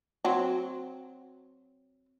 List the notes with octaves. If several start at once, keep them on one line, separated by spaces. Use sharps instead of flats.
F#3 C4